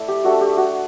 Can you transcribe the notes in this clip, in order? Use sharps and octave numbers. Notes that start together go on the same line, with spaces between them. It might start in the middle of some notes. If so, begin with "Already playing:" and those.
Already playing: A3 E4 D5 E5
G4
A3 D4 F#4 A4
G4
F#4